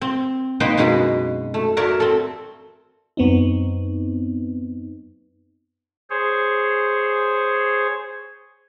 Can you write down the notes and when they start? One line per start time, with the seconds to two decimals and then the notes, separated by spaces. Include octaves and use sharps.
0.01 C4
0.60 A#3 D#4 B4 C5 F#5 G5
0.77 F#2 B2 G#3 F#4 B5
1.54 A3
1.77 F#4 A#4 C#5 D5 E5
2.00 C4 A4
3.17 F#2 B3 C4 D#4
6.10 G#4 C5 C#5